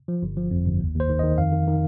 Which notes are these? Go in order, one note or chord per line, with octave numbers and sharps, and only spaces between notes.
F3
G1
F3
F2
G1
D#2
D#2
C5
D#3
D#3 D#5
F2 F5
D#3
D#3